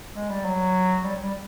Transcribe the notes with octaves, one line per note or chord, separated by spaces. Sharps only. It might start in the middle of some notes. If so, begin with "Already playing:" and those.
G#3
G3
F#3
G3
G3